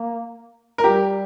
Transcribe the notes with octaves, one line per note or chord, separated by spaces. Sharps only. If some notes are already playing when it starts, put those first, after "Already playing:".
Already playing: A#3
A#4
G3 G4